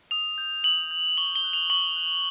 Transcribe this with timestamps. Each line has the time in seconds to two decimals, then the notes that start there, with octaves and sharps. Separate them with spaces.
0.11 D#6 F7
0.38 G6
0.64 D#6 F#7
0.91 G6
1.17 C#6 G7
1.36 G7
1.44 F#6
1.53 F7
1.70 C#6 F#7
1.96 F#6